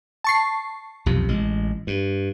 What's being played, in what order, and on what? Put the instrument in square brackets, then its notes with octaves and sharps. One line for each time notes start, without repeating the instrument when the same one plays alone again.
[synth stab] A5 C#6 C7
[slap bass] B1 F2 C3
A1 G#3
G2